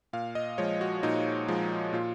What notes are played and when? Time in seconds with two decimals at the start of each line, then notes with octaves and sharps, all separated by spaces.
0.13 A#2 F5
0.35 D#5
0.58 F3 G#3 C#5
0.81 F#4
1.03 A#2 D#4
1.48 F3 G#3
1.93 A#2 F4